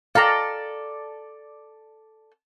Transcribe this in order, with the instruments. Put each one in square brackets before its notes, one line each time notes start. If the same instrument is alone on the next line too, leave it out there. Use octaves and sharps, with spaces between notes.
[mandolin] A4 D5 [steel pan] F5 G5 A#5